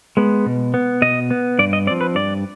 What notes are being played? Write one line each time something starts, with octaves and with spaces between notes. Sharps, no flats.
G#3 B3
B2
B3
B2 D#5
B3
G2 D5
D#5
F3 C4 D5
B4
G2 D5